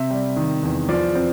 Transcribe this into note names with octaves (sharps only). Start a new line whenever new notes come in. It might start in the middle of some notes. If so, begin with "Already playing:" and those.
Already playing: C3 E5
G3
D#3
E2
F3 D5
C4